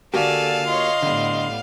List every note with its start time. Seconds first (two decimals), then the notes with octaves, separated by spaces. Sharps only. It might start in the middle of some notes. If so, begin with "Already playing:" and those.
0.14 D3 A#3 F#4 G4 A4 D5 F5 G#5
0.67 F4 C#5 D#5 C6
1.02 A2 D3 G3 B3